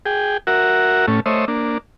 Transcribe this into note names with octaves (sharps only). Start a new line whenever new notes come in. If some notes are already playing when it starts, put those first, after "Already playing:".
G#4 G5
F#4 A#4 E5 F#5
A2 A3 C#4
A3 C5 C#5 D#5 E5
A#3 D4